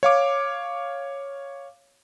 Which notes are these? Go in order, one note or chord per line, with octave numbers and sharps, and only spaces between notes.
C#5 F5 D6